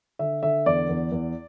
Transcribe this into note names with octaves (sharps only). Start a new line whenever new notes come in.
D3 E5
D3 E5
E2 D5
E2
E2